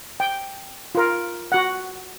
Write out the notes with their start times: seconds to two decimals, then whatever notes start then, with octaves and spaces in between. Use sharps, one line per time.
0.20 G5
0.95 F4 A#4
1.52 F#4 F#5